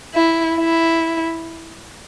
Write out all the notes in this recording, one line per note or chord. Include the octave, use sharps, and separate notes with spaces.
E4
E4